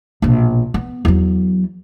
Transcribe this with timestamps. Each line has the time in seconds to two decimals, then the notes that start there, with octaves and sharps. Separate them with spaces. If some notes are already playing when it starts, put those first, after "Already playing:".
0.22 A#1 B2
0.74 B3
1.05 E2 F#3